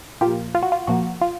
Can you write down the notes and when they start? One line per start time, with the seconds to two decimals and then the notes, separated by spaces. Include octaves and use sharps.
0.21 A#2 F3 A#3 F4 G4
0.55 F4
0.63 F#4
0.72 F4
0.87 A#2 F3 A#3 F#4
1.21 F4